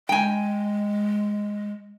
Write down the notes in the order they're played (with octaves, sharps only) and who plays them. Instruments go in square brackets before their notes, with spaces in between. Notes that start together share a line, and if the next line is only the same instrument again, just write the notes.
[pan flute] G#3 [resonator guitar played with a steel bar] G5 G#5